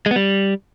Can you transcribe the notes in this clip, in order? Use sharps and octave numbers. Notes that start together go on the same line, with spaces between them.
G#3
B3
G3